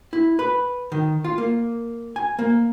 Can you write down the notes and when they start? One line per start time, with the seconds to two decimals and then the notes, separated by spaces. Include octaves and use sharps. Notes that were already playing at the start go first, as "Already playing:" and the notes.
0.13 E4
0.39 B4
0.92 D#3
1.25 F4
1.38 A#3
2.16 G#5
2.39 A#3